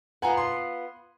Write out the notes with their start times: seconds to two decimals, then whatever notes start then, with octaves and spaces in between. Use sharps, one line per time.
0.22 B3 F4 B4 F#5 G#5 A#5
0.37 C6